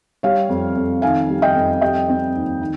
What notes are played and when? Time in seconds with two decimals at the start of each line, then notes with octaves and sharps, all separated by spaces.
0.23 G3 C#5 F5
0.49 F2
0.76 F2
1.02 D#3 F5 G#5
1.30 G3
1.42 D#5 G5
1.55 F2
1.82 G3 D#5 G5
2.09 C4
2.35 D#2
2.61 D#3